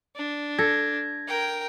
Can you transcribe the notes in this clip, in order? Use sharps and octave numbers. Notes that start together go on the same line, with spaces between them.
D4
A4 G#6 A#6
A#4 G5